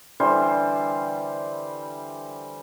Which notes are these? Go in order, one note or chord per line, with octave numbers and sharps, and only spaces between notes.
D3 E3 G3 C5